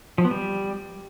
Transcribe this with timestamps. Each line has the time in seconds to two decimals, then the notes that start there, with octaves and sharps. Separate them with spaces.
0.18 F3
0.25 B3
0.31 G3